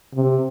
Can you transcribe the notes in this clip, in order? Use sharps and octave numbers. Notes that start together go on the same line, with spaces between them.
C3